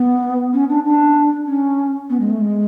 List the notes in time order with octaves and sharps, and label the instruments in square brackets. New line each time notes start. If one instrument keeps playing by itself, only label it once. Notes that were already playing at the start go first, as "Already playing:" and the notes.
Already playing: [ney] B3
C#4
D4
D4
C#4
B3
G#3
A3
G#3